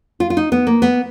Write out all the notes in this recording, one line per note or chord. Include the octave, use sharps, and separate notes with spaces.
F4
F4
D#4
B3
A#3
B3